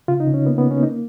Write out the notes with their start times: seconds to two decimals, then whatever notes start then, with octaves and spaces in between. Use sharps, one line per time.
0.08 C#3 F4
0.20 D#4
0.27 C#3
0.34 C#4
0.46 A#3 B3
0.58 B3
0.65 A#3
0.71 C#4
0.83 A#3 D#4